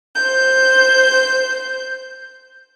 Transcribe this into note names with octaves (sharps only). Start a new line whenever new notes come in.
C5 G6